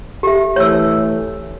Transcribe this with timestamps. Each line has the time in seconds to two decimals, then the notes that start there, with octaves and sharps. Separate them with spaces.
0.23 G4 E5
0.56 E3 A3 C#5 E6